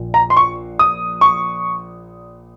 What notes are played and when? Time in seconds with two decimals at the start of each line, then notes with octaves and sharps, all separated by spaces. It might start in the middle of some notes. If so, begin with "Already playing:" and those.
Already playing: A#1 A#2 F3
0.14 A#5
0.30 C6
0.37 C#6
0.79 D#6
1.21 C#6